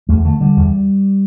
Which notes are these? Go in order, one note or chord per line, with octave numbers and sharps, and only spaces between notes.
E2 A3
D3 A3
D3 G3
E2